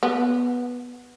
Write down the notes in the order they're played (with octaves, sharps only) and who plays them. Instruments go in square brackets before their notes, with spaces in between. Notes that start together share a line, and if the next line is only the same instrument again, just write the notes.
[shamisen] B3